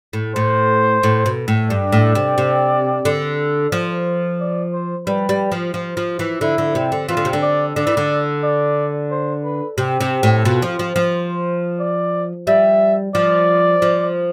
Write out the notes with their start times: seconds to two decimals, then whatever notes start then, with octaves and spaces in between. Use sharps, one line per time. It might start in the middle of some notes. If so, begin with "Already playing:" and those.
0.13 A2
0.35 A2 C5
1.03 A2
1.26 B2
1.48 A2
1.70 G2 D5
1.92 A2
2.15 C3
2.38 C3
3.05 D3
3.72 F3
4.40 D5
4.73 C5
5.06 G3 B4
5.29 G3
5.52 F3
5.74 F3
5.97 F3
6.19 E3
6.41 D3 E4
6.58 D3
6.75 C3
6.92 D3
7.09 E3 F4
7.17 D3
7.25 C3
7.33 D3
7.42 D5
7.76 D3 D5
7.87 E3
7.97 D3
8.43 D5
9.11 C5
9.44 B4
9.78 C3 G4
10.00 C3
10.23 A2
10.45 B2 F4
10.62 F3
10.79 F3
10.96 F3
11.13 C5
11.80 D5
12.47 G3 E5
13.15 F3 D5
13.82 F3